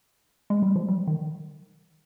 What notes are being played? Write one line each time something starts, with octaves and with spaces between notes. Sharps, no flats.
G#3
G3
F3
G3
D#3